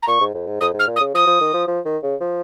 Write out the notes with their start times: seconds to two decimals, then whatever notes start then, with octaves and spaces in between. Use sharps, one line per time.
0.02 A#5
0.07 A#2 C#6
0.21 G#2
0.34 F2
0.47 G#2
0.60 F2 D#6
0.74 G#2
0.79 F6
0.87 A#2
0.96 D#6
1.01 C#3
1.14 F3 D#6
1.27 F3
1.41 D#3
1.53 F3
1.67 F3
1.85 D#3
2.03 C#3
2.21 F3